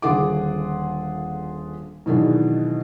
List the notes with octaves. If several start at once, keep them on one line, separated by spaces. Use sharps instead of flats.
D#1 D3 F4 G#4 F#5 D6
B2 D#3 E3 F#3 D4 G#4